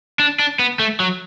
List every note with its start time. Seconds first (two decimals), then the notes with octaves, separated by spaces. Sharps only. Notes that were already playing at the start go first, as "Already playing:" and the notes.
0.19 D4
0.39 D4
0.59 B3
0.79 A3
1.00 F#3